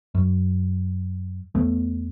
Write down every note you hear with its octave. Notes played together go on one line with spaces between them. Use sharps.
F#2
E2 A3 B3